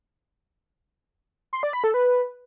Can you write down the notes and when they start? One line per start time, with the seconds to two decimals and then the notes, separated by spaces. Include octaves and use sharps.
1.53 C6
1.63 D5
1.73 B5
1.84 A4
1.94 B4